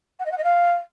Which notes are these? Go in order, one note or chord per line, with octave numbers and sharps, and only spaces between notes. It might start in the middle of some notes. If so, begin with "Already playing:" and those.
F#5
D#5
F#5
D#5
F5